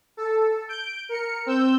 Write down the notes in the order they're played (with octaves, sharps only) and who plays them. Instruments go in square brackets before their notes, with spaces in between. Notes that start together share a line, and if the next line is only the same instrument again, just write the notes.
[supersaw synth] A4
G6 D7
A#4 C#7
C4 E6 G6